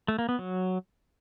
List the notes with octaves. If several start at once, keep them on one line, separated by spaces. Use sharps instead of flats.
A3
A#3
B3
F#3